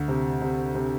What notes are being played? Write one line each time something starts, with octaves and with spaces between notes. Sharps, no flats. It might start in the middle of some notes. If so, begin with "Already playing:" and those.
Already playing: D2
C3
C3
C3